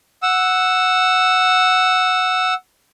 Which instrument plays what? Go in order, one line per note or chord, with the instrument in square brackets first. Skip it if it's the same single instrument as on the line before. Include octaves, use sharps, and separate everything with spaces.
[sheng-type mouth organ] F#5 E6